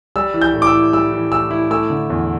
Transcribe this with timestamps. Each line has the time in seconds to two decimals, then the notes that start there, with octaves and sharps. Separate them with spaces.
0.16 G3 E6
0.34 E3
0.42 G6
0.53 A2
0.62 D6
0.67 E6
0.73 E4
0.93 G3 E6
1.12 E3
1.31 A2 E6
1.51 E4
1.70 A3 E6
1.90 D3
2.10 E2